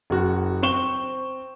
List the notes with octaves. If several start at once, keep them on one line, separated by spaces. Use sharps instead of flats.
F#1 F#4
C4 C5 C#6 E7 G7